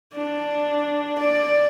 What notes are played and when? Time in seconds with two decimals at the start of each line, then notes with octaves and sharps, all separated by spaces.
0.14 D4
1.18 D5